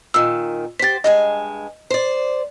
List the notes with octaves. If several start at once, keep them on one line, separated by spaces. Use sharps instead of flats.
A#2 D#3 E6
G4 C5 A6 B6
G2 G#3 D#5 G#5
C5 D5